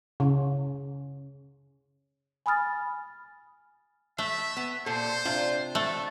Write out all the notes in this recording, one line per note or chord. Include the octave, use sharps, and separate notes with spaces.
C#3
G#5 B5 D#6 F6 A6
A3 E5
B3
A#2 A4 C5
C3 D4 F4
A3 A4